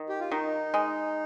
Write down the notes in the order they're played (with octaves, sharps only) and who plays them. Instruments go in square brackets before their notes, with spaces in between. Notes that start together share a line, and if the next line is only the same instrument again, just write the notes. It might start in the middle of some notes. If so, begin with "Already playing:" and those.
Already playing: [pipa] D#3
[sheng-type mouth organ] G4
F4
[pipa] D#3 [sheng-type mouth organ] D#4
[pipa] G#3